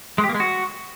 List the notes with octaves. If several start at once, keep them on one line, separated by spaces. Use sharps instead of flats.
G#3
G4
A#3
G#3
F#4